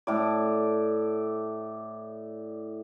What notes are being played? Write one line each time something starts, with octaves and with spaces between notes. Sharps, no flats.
A2 D5